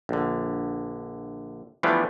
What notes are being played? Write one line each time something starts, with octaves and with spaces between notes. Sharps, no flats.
A#1 D3
E3 F3 G3 A3 B3 D4